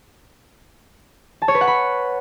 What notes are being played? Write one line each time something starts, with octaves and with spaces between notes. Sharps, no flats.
A5
C#5
B4
F#5
B5